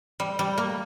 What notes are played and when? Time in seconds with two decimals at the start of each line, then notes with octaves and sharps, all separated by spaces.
0.20 G3
0.39 G3
0.58 A#3